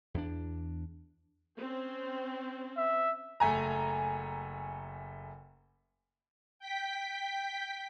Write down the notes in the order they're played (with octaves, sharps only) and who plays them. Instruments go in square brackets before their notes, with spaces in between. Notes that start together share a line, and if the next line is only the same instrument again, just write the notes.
[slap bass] E2 D4
[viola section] C4 C#4 C5
[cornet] E5
[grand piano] F#1 A3 G#5 A#5
[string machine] G5 B6